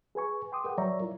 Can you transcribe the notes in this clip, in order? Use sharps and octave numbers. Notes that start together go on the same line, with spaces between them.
G#4 B4 G#5 C#6
G5 C6 D6 D#6
G#4 A#4 B4 F#5 G5
F#3 C#5 D5 E5 A#5 C#6
E4 F4 A#4